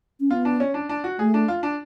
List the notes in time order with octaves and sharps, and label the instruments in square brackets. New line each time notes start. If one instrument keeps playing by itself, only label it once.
[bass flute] C#4
[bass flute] B3 [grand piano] F4
[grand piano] D4
C#4
D4
D4
F#4
[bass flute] A3 [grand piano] G#4
[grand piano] D4
F4
D4